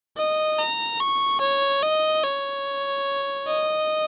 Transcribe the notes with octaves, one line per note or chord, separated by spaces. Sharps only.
D#5
A#5
C#6
C#5
D#5
C#5
D#5